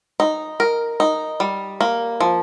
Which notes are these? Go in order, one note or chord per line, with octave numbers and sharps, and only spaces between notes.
D#4
A#4
D#4
G3
A#3
F3